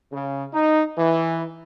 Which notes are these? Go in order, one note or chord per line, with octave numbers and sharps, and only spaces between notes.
C#3
D#4
E3